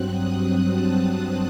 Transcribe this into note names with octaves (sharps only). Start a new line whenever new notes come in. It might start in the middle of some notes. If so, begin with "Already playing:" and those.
Already playing: G2 F#3 C4 F#6
D#6
A5